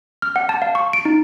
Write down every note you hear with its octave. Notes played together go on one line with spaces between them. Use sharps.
F6
F#5
A5
F5
C#6
D7
D#4